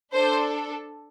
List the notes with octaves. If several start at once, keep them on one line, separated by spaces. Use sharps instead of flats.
D4 A4 C5